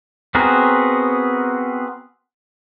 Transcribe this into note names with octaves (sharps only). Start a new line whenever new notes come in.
B3 C4 F#4 G#4 A#4